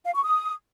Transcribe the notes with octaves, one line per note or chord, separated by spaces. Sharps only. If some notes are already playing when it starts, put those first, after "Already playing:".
F5
C#6
D#6